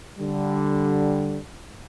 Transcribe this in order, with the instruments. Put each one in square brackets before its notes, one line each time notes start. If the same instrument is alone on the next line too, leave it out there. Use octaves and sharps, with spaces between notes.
[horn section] D3 G3